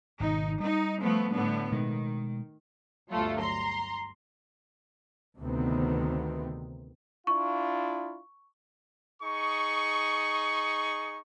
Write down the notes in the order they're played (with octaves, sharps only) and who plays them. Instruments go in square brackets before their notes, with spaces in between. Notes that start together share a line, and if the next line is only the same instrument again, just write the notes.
[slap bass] G#1 B2 D#3 [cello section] D#4
[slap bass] G3 [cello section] D#4
[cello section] F3 A3 B3
A2 D3 B3
[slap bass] B2 G#3 [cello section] D#3
[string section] G1 D2 F#3 A3 F4
A#5 C6
[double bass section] D2 C3 D#3 B3 C4
[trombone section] D4 E4 F4 [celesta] C#6
[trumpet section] D#4 G#4 C#6